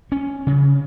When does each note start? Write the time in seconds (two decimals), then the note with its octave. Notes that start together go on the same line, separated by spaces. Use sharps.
0.12 C#4
0.47 C#3